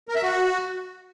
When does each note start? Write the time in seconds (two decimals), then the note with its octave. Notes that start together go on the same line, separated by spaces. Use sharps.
0.09 A#4
0.15 E5
0.22 F#4